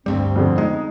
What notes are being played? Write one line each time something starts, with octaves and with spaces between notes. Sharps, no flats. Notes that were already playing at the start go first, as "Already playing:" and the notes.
D2 G2 G3 C4
F2 B2 D3
G#3 D#4